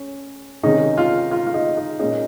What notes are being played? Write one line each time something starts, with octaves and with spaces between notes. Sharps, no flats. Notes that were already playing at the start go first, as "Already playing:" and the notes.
Already playing: C#4
C3 D#3 G#3 C#4 D#4
F4
F4
F4
D#4
D#4
A#2 G#3 C#4 D#4